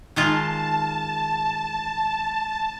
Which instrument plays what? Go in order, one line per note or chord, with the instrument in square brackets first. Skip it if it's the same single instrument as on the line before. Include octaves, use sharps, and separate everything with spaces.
[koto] D#3 G#3 F4 [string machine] A5